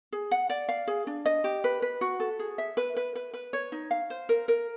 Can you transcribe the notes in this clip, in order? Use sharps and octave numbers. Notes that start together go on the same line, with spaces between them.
G#4
F#5
D5
F5
G#4
D4
D#5
G4
B4
B4
F#4
A4
G#4
E5
B4
B4
B4
B4
C#5
D#4
F5
C5
A#4
A#4